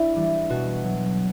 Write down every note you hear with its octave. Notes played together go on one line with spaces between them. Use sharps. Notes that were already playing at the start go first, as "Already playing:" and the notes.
Already playing: D4 E4
E3 G3
B2 F#4
F#3